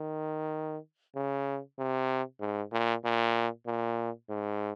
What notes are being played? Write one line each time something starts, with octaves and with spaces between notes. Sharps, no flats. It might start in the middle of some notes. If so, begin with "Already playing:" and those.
Already playing: D#3
C#3
C3
G#2
A#2
A#2
A#2
G#2